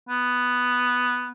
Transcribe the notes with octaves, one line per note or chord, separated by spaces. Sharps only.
B3